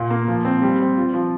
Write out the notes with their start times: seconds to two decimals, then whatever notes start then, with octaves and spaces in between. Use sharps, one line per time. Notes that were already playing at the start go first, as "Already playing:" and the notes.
Already playing: A#2 A#3
0.10 A#3
0.28 F3
0.45 C4
0.62 G3
0.80 C4
0.97 F4
1.14 F3